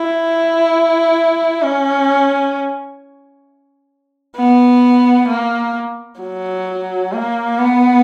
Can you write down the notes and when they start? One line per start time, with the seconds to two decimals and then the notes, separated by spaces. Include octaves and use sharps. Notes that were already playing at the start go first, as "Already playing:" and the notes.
Already playing: E4
1.62 C#4
4.37 B3
5.29 A#3
6.21 F#3
7.12 A#3
7.58 B3